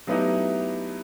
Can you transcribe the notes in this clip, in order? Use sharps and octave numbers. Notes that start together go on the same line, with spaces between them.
F#3 A3 B3 D#4 E4 G4